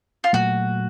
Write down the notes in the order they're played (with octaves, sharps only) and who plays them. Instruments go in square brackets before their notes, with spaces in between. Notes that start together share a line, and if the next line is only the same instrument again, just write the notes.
[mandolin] F4
[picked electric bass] A#2 F#3 A3 [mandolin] F#4